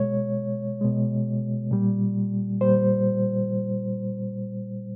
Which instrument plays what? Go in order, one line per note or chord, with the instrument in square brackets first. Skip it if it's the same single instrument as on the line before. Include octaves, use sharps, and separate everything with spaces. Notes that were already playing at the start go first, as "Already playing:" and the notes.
Already playing: [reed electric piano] B2 G#3 C#5
B2 G#3
A#2 G3
A#2 G3 C5